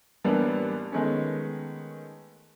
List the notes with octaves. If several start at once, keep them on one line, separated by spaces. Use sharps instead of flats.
A1 G3 A#3 B3 D4 B4
D#3 G#3 A3 B3 C#4